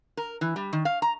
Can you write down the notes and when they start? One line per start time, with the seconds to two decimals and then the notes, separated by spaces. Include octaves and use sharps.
0.17 A#4
0.41 E3
0.56 G3
0.73 D#3
0.85 F5
1.02 A#5